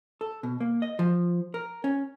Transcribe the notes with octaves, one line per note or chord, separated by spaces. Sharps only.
A4
B2
A#3
D#5
F3
A#4
C#4